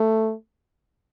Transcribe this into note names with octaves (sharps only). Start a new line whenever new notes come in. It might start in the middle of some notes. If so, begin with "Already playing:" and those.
Already playing: A3